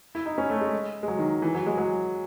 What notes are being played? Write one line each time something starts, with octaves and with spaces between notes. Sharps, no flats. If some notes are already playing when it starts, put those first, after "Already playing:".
E4
D#4
C#4
A3
G#3
G#3
F#3
D#3
E3
F#3
G#3
F#3